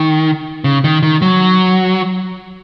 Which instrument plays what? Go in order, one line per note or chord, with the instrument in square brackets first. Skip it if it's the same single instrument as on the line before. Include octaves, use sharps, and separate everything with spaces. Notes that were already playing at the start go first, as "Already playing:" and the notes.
Already playing: [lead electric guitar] D#3
C#3
D#3
D#3
F#3